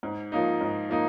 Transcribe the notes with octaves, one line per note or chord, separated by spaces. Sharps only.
G#2
F3 A#3 D#4
G#2
F3 A#3 D#4